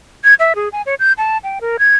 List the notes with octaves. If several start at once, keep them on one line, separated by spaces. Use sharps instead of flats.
G#6
E5
G#4
G#5
C#5
G6
A5
G5
A#4
G#6